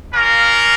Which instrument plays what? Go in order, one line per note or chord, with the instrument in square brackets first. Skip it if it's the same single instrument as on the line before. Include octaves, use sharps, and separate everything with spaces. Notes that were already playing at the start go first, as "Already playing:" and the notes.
[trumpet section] A#3 C#4 F4 A#4